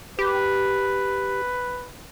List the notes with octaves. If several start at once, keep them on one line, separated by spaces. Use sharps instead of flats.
G4 B4